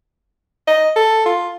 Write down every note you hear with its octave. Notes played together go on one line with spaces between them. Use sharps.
D#5
A4
F4